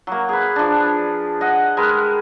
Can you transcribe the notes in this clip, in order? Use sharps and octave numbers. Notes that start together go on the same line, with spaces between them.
F#3 A#3
G#4 B4
F3 D4
D#5 F#5
G#3 G4 A#4 B4